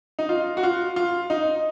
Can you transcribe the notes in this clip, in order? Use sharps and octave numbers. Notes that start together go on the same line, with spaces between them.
D#4
F4
F#4
F4
F4
D#4